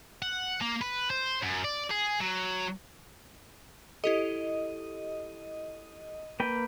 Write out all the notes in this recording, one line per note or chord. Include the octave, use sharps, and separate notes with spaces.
F#5
A#3
B4
C5
F#2
D5
G#4
F#3
E4 G4 A4 D#5
A#3 B4 G5